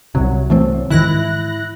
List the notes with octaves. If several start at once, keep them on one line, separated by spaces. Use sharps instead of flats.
C2 C3 F#3
E3 A3 C4
G#2 D#3 E3 E4 F#6 A#6